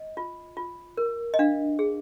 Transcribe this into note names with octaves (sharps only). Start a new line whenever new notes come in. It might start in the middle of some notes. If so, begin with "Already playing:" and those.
Already playing: D#5
F4
F4
A#4
D#5
D4 F5
G#4